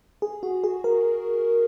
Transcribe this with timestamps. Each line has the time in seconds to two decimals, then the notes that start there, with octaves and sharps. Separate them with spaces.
0.22 G#4
0.43 F#4
0.64 G#4
0.84 A#4